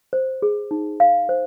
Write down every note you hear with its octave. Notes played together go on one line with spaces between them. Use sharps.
C5
G#4
D#4
F5
C5